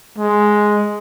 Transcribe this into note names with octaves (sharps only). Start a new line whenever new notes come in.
G#3